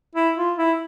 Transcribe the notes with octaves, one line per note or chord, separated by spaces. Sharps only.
E4
F4
E4